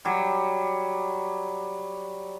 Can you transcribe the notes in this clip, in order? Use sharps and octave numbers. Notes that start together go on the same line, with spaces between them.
F#3 G3